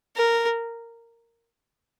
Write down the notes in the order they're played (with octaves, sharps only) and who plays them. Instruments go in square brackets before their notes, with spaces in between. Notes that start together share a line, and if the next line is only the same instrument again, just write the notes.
[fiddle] A#4